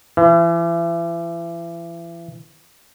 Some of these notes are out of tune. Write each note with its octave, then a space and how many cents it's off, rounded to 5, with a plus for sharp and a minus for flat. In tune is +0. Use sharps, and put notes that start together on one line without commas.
E3 +35